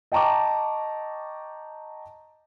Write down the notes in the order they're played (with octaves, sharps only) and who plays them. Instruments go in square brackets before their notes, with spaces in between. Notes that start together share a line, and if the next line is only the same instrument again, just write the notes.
[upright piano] D#5 G5 A5 A#5 C#6 D6